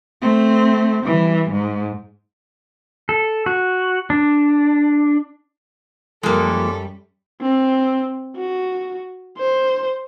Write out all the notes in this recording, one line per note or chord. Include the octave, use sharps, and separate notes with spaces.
A3 C4
E3 G3
G#2
A4
F#4
D4
F#2 F3 G3 G#3 A#3 A4
C4
F#4
C5